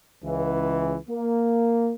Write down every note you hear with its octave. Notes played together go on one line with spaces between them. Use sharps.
C#2 E3
A#3